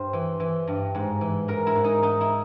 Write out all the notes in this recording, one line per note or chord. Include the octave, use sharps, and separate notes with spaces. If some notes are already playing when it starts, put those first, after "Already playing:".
Already playing: G2 C5
E3
E3
G2
G#2
E3
G#2 A#4
E4
G#2
D#4
G#2 D#4
E4